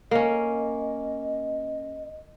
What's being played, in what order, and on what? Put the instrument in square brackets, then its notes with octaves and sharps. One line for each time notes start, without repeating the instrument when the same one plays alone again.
[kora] A#3 C#4 [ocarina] D#5